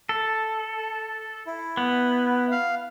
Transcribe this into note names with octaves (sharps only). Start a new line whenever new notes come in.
A4
E4
B3
F5